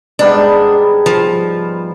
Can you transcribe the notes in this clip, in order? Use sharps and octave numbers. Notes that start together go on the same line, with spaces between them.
G#2 G3 B3 D4
F3